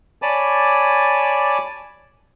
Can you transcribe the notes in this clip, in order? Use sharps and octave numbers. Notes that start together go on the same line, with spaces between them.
C#5 D5 G#5 A5 B5 D6